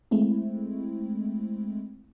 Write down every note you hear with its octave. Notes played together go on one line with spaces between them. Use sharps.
G#3 A3 C4 E4